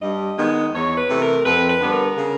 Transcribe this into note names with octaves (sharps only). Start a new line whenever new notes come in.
G2 D#5
D#3 G#3 B3
E2 C#5
B4
C3 E3 A3
A#4
F2 B4
B4
D3 G3 B3
A#4
C#3